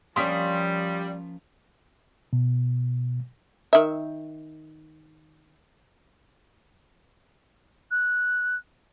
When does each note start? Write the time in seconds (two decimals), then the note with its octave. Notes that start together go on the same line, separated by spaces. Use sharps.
0.16 F3 G3 A#3 C#4 C6 D#6 B6
2.33 B2
3.73 D#3 E5
7.91 F#6